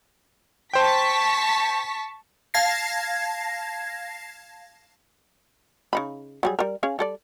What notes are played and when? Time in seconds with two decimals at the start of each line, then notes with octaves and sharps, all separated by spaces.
0.74 C5 G5 A5 C#6 B6
2.54 F5 A5 G#6 A#6 C7
5.93 C#3 D#4 B5
6.43 F#3 G3 G#4
6.59 G3 A#4
6.83 C#4 G#4 F5
6.99 G3 A4 D5